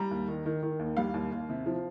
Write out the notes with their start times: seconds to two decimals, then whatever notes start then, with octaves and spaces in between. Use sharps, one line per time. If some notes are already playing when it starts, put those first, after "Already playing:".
Already playing: G3 A#5
0.11 D#2
0.28 D#3
0.46 D#3
0.63 D#3
0.79 D#2
0.97 G3 F5
1.14 D#2
1.32 D#2
1.50 C3
1.66 F3